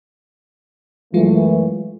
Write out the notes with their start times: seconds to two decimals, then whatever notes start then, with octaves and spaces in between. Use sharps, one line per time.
1.14 F#2 E3 F#3 G#3 A3 F4